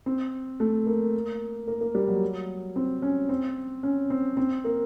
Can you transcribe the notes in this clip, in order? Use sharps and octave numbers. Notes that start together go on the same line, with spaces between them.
C4
A3
A#3
A#3
A#3
G3
F#3
C4
C#4
C4
C#4
C4
C4
A#3